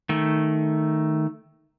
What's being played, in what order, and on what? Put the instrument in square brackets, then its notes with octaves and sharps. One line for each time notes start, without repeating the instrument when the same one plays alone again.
[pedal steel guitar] D#3 A3